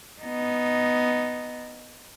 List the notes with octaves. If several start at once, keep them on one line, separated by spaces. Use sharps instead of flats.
B3 D#4